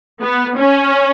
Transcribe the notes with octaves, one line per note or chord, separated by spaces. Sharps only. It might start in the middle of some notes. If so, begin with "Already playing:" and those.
B3
C#4